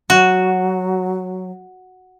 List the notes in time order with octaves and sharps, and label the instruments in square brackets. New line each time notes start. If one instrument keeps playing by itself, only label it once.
[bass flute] F#3 [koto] F#4